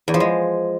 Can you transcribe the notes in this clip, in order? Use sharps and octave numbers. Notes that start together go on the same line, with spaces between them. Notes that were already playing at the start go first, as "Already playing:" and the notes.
E2
F3
G#3